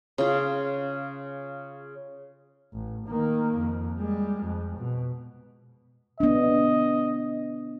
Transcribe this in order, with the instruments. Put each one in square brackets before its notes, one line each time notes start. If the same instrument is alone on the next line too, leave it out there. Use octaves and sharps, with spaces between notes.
[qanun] C#3 F4
[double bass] A1
D#3 A#3
F2
G3 G#3
F2
B2
[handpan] B3 D4 [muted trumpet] D#5